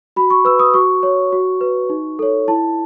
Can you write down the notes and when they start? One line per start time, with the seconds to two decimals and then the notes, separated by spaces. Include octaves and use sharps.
0.16 F#4 B5
0.30 C#6
0.45 B4 E6
0.59 D#6
0.74 F#4 C#6
1.03 C#5
1.32 F#4
1.61 B4
1.90 D#4
2.19 A4 C#5
2.48 E4 A5